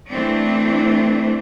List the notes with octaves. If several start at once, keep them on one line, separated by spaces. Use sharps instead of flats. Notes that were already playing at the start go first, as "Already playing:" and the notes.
E3 A3 C4 D4